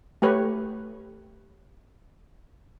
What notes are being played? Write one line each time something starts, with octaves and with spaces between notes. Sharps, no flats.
A3 G4 B4 C#5